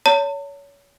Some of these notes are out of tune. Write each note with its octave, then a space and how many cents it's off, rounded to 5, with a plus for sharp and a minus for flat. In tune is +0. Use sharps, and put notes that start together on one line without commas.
C#5 +30 A5 +45